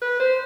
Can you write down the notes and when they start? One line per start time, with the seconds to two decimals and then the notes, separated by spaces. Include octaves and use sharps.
0.02 B4
0.20 C5